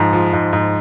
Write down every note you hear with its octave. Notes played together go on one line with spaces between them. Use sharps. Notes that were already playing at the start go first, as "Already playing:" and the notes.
Already playing: G#2 F3
F3
G#2
G#2